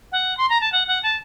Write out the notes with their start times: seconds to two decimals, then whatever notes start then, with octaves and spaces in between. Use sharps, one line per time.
0.12 F#5
0.37 C6
0.49 A#5
0.61 A5
0.72 F#5
0.88 F#5
1.03 A5